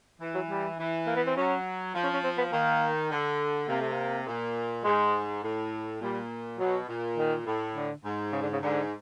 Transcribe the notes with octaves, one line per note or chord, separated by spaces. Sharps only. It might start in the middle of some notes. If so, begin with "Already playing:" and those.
E3
F#3
G3
E3
A#3
B3
C4
F#3 C#4
F3
C#4
C#4
C4
B3
D#3 A#3
D3
C3 A#3
A3
A#3
A#2
G#2 G#3
A2
A#2 G3
B2 F#3
A#2
D#3
A2
D3
G#2
C#3
D3
C#3
G#2 D3